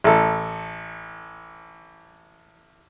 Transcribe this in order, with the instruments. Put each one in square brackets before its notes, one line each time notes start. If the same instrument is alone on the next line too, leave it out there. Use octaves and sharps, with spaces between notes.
[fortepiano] A1 A4